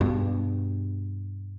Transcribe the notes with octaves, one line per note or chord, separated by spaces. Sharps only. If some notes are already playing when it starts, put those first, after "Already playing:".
G2 B2